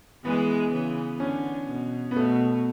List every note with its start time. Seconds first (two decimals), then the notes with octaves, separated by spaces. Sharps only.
0.24 E3 G#3 B3
0.72 C#3 E3
1.20 D3 C#4
1.68 B2
2.11 B3
2.16 B2 A3